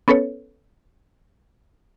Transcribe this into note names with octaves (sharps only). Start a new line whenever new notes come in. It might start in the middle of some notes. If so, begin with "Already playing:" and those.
B3 C#4 A4 B4 C#5